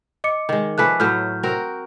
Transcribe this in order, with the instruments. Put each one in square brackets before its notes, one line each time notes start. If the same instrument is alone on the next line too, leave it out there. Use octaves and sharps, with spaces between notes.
[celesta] D#5 D6 C#7
[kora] D#3 G#3
[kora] F3 A3 B4 [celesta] G#5 D6 F#6
[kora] A2 F#3 [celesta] F6 G6
[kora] C4 F#4 A#4